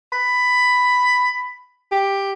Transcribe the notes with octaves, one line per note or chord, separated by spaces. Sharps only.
B5
G4